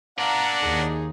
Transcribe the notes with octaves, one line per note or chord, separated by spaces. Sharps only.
D4 A#4 D5 F5 F#5 A#5
D#2 D#4 G#4